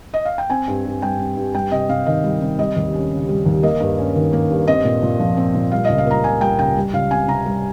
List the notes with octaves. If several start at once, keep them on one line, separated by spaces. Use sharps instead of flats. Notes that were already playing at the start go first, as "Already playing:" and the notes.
D#5
F5
G5
C4 G#5
G2
G2
G3 G5
C4
G2
G3 G5
C3 D#5
C3 F5
D#3 D#5
G3
C3
G3 D#5
D#2
C#4
C#3
G3
D#2
A#3 D#5
G2
C#4
D#3
A#3
G2
C4 D#5
A#2
A#2
F3
C4
A#2
G3 F5
C#2 D#5
F5
A#3 A#5
C#3 G#5
G3 G5
C#2 G5
G3
C#2 F5
C4 G#5
C3 A#5
G3